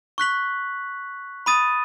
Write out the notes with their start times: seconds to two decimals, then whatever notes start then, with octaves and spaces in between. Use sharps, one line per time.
0.18 C#6 F#6 B6 F#7
1.46 B5 D#6 A6 D#7